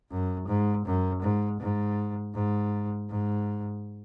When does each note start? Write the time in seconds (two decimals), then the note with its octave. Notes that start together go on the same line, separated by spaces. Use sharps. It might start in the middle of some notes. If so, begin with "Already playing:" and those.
0.11 F#2
0.48 G#2
0.85 F#2
1.22 G#2
1.60 G#2
2.34 G#2
3.09 G#2